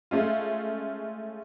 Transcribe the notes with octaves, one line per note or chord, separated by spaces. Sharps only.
G#3 A3 C#4 F4